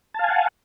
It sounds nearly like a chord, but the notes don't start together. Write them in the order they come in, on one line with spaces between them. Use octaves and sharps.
A5 F5 G#5 F#5